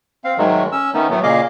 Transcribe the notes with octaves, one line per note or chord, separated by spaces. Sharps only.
C4 F5
G#2 D#3 F#3 G#3 A3
C#4 E6
D#3 A3 B3 C#4 D#4
A2 F#3 A3 B3
A#2 C#3 G#4 D#5 F5 D6